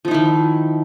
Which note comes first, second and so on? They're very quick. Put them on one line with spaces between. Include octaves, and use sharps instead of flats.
F3 D#4 E4 D#3